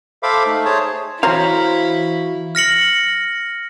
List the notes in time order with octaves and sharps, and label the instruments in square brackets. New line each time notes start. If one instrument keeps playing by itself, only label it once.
[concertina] A4 C5 E5 F5 B5 D6
A3 D#4
G#4 C5 C#5 A5
[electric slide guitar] E3 F#4 F5 [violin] E4 [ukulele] C5 C#5 A#5
[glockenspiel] F6 A#6 C#7 F#7